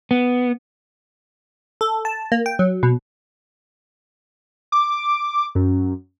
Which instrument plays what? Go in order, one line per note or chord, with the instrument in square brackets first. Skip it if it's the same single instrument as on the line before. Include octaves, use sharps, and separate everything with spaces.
[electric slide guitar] B3
[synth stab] A4
A5
A#3
G5
F#3
B2
[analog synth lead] D6
F#2